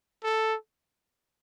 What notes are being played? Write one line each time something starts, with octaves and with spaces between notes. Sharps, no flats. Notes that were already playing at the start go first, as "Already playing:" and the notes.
A4